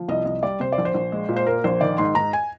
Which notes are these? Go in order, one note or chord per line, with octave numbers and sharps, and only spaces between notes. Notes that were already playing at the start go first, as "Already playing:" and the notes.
Already playing: F3
C2 D#5
C2 D#5
G3 D5
C3 C5
D5
A#1
C5
A#1
G#3
A#2
C5
A#3 A#4
A#1 C5
D#3 D5
G#2 C6
G#2 A#5
G#5